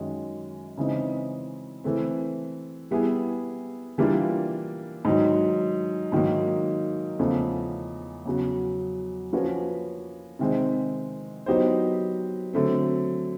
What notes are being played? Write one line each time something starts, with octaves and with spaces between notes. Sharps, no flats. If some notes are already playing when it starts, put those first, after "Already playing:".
Already playing: F#2 D#3 G#3 C#4
C#3 E3 G#3 C4 D#4
E3 A3 C4
G3 B3 E4 G#4
E3 G3 A#3 D4 F4
G#2 D#3 F#3
G#2 D#3 F#3 A#3
E2 C#3 F3 A3
E2 C#3 F#3
F3 A#3 C#4 F#4 B4
C3 D#3 G#3 C4
F#3 B3 D#4 G4 C5
D3 F#3 A3 C4